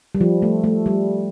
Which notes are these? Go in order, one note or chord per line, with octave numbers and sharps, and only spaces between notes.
G3
F3
A3
A3
G3